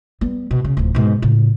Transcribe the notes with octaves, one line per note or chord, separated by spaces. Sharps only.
G3 B3
B2
C#3
D1 F3
G#2 B2
A2 C#3